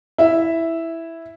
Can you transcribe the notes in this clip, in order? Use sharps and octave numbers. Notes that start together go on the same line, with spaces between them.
E4 E5